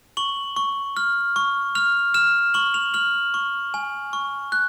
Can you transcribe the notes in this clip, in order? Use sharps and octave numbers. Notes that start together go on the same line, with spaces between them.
C#6 F#7
C#6
F6
C#6
F6 F7
F6 E7
C#6 F#7
F7
F6 F#7
C#6
G#5
C#6
F#6